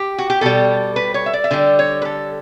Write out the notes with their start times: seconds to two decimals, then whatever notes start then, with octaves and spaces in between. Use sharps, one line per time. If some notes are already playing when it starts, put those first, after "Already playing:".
Already playing: G4
0.18 F#4
0.30 G4
0.41 B2 G3 A4
0.96 B4
1.14 C#5
1.26 E5
1.33 D5
1.44 E5
1.51 D3 G3 D5
1.79 C#5
2.02 B4
2.05 A4